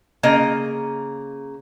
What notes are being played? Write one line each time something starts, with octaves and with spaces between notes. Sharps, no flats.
C#3 A#3 D#5